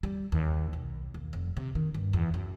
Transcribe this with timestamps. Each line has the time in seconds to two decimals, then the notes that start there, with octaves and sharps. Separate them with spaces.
0.03 G3
0.32 D#2
0.73 B1
1.14 D#2
1.33 F1
1.57 C3
1.75 D#3
1.94 G2
2.13 E2
2.34 F#2